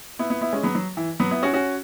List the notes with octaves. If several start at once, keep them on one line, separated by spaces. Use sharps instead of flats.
B3 E4
B3 E4
B3 E4
G#3 C#4
F#3 B3
F#3
E3
F#3 B3
B3 E4
C#4 F#4
C#4 F#4